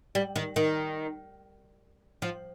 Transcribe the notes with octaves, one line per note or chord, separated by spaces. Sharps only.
G3
D#3
D#3
F3